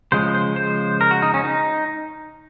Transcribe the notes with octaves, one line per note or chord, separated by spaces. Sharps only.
C#3 F3 G#3 C5
C5
C5
A#4
F#4
D#4
C#4
D#4